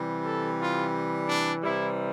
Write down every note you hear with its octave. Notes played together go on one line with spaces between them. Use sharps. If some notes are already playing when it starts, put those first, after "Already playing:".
Already playing: C3 E3 G3
A4
F4
D4
C3 E3 G3 E4